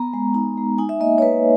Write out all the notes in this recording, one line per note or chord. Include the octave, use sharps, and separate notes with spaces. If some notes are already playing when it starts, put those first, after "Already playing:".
Already playing: B3 A#5
G#3
D#4 A#5
G#3
D#4 G#5
E5
A#3 D#5
C#5
A#3 B4